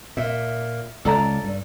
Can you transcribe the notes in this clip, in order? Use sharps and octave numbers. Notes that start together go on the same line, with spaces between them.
A#2 E5
C#2 A4 D5 A#5
G2